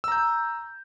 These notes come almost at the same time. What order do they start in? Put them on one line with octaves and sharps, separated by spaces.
E6 A#5 G6